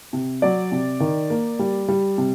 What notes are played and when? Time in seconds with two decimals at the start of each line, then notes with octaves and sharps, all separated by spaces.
0.13 C3
0.42 F#3 D5
0.72 C3
1.00 D#3
1.30 A#3
1.59 G3
1.88 G3
2.18 C3